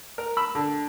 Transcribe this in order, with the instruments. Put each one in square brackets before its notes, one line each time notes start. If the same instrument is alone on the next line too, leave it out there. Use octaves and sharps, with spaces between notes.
[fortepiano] A#4
B5 E6
D3